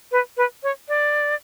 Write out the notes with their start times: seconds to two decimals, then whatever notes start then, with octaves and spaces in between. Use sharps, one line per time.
0.12 B4
0.37 B4
0.63 C#5
0.88 D5